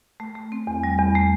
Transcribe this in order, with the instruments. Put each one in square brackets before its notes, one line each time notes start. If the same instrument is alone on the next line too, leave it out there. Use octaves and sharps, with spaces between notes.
[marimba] A3
A3
C4
E2
G3
E2
A3